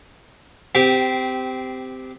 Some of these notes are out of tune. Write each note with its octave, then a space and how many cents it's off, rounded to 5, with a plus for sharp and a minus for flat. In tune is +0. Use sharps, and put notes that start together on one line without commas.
C4 -20 G4 +0